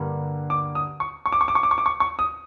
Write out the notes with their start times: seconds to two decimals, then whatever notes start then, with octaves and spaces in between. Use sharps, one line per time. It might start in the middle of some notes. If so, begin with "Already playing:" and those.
Already playing: G2 D3 G3 A#3 D4
0.50 D6
0.75 D#6
1.00 C#6
1.26 C#6
1.32 D6
1.41 C#6
1.48 D6
1.55 C#6
1.63 D6
1.71 C#6
1.78 D6
1.86 C#6
2.00 C#6
2.19 D#6